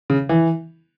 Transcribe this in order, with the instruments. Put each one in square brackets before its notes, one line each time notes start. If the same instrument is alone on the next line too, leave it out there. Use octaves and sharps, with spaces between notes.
[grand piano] C#3
E3